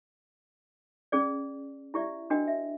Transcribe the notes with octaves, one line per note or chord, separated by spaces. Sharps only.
C#4 G#4 D5
E4 G4 D5 E5
D4 F#4 A#4 D#5 G5
E5